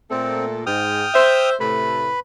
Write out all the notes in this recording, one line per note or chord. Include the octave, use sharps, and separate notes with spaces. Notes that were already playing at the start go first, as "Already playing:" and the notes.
A#2 A3 C4 A4
G#2 G5 D#6 F6
C5 E5
A2 C3 A3 B4 B5